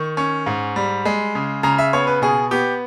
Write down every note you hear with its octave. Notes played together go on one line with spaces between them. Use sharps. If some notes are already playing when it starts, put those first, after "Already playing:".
Already playing: D#3 C#6
C#4
G#2
G3
G#3
C#3
C#3 A#5
E5
B3 C#5
B4
B2 G#4
B3 G4